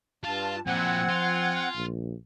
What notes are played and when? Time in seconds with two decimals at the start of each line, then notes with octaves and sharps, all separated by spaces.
0.24 G2 F4 F5 A5
0.67 A#2 F3 C4 E4 F#5 G#5
1.09 F4
1.75 A#1